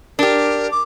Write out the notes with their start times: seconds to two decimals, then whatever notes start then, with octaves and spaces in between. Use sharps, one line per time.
0.19 D4 G4 A#4
0.71 D6